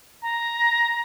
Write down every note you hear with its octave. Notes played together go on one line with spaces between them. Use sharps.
A#5